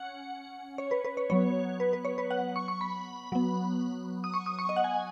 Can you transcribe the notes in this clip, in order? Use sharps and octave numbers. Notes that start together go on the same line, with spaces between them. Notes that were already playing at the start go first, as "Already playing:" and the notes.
Already playing: C#4 F#5
C#5
B4
B4
C#5
F#3 B3 C#5
B4
B4
C#5
B4
F#5
C#6
C#6
B5
F#3 B3
D#6
C#6
D#6
C#6
D#5
F#5
G#5